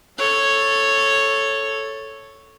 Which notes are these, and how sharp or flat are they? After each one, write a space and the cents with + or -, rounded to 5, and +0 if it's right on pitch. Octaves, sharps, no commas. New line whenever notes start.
A4 +0 C#5 -5